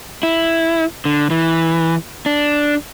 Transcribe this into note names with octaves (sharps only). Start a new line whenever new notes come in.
E4
D3
E3
D4